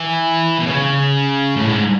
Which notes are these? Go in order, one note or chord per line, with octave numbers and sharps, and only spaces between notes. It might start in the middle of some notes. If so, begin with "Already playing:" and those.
Already playing: E3
B2
C#3
A2
G#2